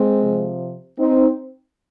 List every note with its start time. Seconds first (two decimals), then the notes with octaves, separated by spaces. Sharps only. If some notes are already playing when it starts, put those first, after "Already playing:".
Already playing: G#3 C4
0.21 C3 F3
0.99 C4 D#4